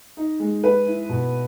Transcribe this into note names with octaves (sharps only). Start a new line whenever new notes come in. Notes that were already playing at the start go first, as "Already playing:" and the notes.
D#4
G#3
B4
E4
B2